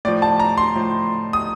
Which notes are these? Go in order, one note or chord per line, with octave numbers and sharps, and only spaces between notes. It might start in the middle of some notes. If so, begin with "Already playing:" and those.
A2 F3 D5
A5
A#5
C6
A2 F3
D#6